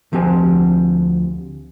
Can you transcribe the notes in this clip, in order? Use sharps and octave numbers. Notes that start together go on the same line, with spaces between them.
D2 F3 C4 G4 G#5